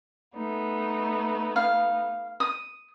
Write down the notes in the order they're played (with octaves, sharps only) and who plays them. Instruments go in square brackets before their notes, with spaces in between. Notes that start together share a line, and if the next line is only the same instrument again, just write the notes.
[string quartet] A3 B3 D#4
[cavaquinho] F5
D#6